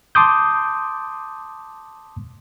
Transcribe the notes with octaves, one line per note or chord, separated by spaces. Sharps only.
A5 C6 D6 D#6 G6